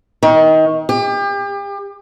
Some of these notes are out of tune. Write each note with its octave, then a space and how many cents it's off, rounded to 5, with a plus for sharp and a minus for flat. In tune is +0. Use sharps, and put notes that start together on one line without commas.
D#3 +25
G4 +35